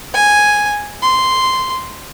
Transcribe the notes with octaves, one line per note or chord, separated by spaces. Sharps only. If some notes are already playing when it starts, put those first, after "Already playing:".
G#5
C6